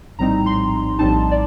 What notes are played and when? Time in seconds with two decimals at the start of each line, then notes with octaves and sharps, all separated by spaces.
0.19 A#1 A2 G3 C4 D#4 A#5
0.46 C6
0.99 A#1 A2 G3 C4 D#4 A5
1.31 D5